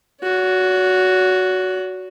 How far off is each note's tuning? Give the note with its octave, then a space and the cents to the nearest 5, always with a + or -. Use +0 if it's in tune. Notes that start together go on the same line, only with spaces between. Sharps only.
F#4 +0 C#5 +45